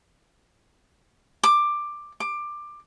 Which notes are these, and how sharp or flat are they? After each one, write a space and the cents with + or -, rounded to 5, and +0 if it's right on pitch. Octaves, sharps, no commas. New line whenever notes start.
D6 +10
D6 +15